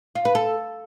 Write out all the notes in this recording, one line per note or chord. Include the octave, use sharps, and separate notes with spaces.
F4
B4
A4